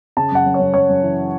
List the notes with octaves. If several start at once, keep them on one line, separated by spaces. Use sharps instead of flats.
C#3 A5
F#2 F#5
F#2
C#5
F#2
F#2 C#5
F#2
E3